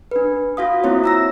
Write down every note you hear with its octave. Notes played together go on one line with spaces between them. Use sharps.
D4 B4
F4 F#4 F5 D#6
A#3 C4 E4 C#5
A#5 E6 A#6